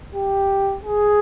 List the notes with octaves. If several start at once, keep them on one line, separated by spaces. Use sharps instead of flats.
G4
G#4